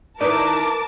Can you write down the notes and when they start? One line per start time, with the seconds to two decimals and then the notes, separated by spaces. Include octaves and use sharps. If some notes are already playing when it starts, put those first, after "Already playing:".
0.21 D#3 E3 D#4 A#4 B4 D5 A5 D6